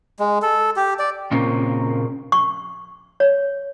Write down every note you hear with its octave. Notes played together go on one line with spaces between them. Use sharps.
G#3
A4
G4
D5
A#2 C#3 A#3 C4
C#6
C#5